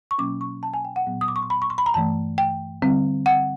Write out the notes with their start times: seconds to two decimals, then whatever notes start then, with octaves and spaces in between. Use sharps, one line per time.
0.11 C#6
0.18 B2 F#3 A#3 C#4 D6
0.41 C#6
0.63 A5
0.74 G#5
0.85 G5
0.96 F#5
1.07 A#2 F#3 B3
1.21 D#6
1.28 D6
1.36 C#6
1.43 C6
1.50 B5
1.62 C#6
1.70 C6
1.78 B5
1.86 A#5
1.94 G2 E3 A3 A5
2.38 G5
2.82 D3 G3 C4
3.26 F#5